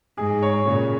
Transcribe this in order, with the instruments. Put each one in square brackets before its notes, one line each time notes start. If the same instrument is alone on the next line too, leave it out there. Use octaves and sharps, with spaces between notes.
[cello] G#2 [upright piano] G#4
[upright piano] C#5
[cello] A#2 [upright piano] C#3